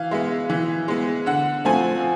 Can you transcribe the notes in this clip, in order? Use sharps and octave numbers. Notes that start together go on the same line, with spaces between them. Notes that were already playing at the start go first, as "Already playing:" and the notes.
Already playing: E3 F5
G#3 B3 E5
E3
G#3 B3
D3 F#5
F3 A3 C4 G#5